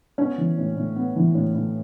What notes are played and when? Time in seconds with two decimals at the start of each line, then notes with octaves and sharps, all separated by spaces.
0.18 B3 C#4
0.38 E3
0.58 A2
0.77 A2
0.96 B3
1.16 E3
1.35 A2
1.54 A2